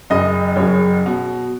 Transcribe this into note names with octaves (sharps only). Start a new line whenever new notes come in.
F#1 F#2 C#3 D#5
F#1 F#2 C#3 C#5
B2